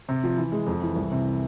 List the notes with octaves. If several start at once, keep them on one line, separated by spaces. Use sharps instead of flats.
C3
F3
E3
G#3
F2
E3
C2
C3